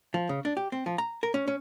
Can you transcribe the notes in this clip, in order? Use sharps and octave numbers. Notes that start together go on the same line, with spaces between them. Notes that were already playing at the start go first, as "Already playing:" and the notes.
F3
C#3
D4
G4
C4
F3
A#5
A#4
C#4
C#4